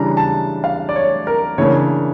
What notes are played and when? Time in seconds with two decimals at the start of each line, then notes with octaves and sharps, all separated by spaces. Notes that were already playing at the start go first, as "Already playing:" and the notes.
Already playing: C#3 E3 G3 D4 A#5
0.17 A5
0.64 F5
0.89 D5
0.96 C#5
1.27 A#4
1.58 C#3 E3 A#3 D4 C#5